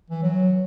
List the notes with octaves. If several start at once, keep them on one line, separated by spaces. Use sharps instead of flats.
E3
F#3